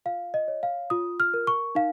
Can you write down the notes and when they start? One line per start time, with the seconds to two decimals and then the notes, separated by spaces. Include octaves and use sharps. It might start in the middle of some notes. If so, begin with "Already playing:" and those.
0.06 F4 F5
0.34 D#5
0.48 C#5
0.63 F5
0.90 F4 D#6
1.20 F6
1.34 A#4
1.47 C#6
1.75 D#4 F5